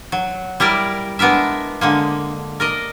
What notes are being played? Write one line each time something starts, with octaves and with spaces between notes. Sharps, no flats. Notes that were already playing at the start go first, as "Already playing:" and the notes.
F#3
G3 E4 A#4 D5
G#3 B3 D4 A#4 E5
D3 G#3 A#3
A#4 D5 D#5